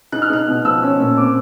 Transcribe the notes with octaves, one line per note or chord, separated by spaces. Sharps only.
D#4 F#6
F6
D#4 F#6
B2
F3 E6
C#4
A#2
C4 D6